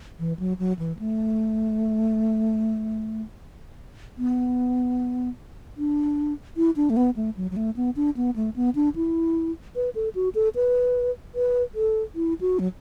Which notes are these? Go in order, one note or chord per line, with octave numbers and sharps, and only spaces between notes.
E3
F#3
F#3
E3
A3
B3
D4
E4
D4
A3
B3
A3
F#3
F#3
A3
B3
D4
B3
A3
B3
D4
E4
B4
A4
F#4
A4
B4
B4
A4
E4
F#4
F#3